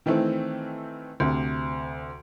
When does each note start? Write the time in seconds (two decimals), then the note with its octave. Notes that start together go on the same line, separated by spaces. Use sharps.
0.06 D#3 E3 A3 C4
1.20 D2 C3